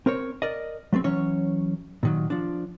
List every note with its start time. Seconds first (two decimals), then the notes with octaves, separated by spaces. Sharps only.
0.06 C4 A#4 C5 C#5
0.42 A#4 D5 D#5
0.93 F#3 A3 B3 C4
1.04 E3 F#3 C#4 C#5
2.03 A#2 D#3 F#3
2.30 F3 D4